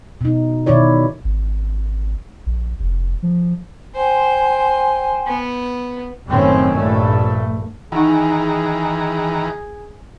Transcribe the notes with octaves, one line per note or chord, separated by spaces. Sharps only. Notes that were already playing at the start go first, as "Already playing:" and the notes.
B2 D#4
B2 D#3 E4 C#5 D5
G#1
A#1
F1
F3
C5 G5 G#5 C6
B3
F#1 A2 D#3 C4 C#4
A#1 G2 A3
D#3 E3 D#4 G#4 F#5 A#5